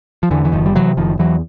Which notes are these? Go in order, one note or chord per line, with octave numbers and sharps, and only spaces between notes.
F3
E2 D3 E3
E3
F#1 D#3 F3
G3
C3 E3 F#3
F#1 D#3 F3
E2 E3 F#3